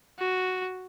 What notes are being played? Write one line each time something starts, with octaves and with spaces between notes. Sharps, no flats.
F#4